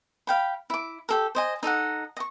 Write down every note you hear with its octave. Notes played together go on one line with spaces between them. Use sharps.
F5 G5 B5
E4 D6
G4 A4 A#4
C5 D#5 G#5
D#4 A4 D#5 F#5
D#5 C#6